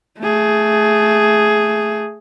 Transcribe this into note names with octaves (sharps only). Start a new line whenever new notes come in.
A3 G#4